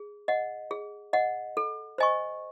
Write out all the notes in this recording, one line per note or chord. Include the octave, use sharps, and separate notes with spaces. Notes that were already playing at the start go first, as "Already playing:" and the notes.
Already playing: G#4
D#5 F#5
G#4
D#5 F#5
A4
C5 D#5 G#5 C#6